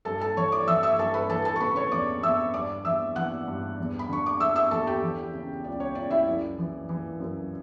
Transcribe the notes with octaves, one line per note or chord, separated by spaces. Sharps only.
G2 A4 A5
A4 A5
E3 C#5 C#6
D5 D6
E3 E5 E6
E5 E6
G2 A4 A5
B4 B5
E3 A4 A5
A4 A5
C#6
C#3 B4 B5
C#5 C#6
E2 D5 D6
E2 E5 E6
G2 D5 D6
E3 E5 E6
E3 F#5 F#6
G2
E2
B5
D3 C#6
D6
D3 E5 E6
E5 E6
E2 A4 A5
G4 G5
E3
C#3
C#2 D5
C#5
C#2 D5
E4 E5
F#2 D5
E3
E3
F#2